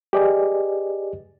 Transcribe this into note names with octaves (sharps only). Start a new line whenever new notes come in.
G4 G#4 B4 D5 D#5 G#5